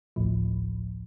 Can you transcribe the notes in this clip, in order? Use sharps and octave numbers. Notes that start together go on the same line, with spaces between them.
A1 D2 A2 F3